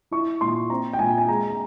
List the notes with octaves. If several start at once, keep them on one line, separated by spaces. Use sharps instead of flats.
E4 C#6
A#2 C6
C4 A#5
G5
A#2 G#5
G#5
G#3 A#5
A#5